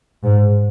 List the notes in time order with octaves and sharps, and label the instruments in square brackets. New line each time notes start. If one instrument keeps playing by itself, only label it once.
[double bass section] G#2